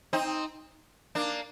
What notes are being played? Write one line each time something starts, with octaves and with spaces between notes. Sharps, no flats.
C4 D#4
A#3 D4